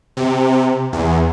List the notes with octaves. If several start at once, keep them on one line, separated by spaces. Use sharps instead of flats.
C3
E2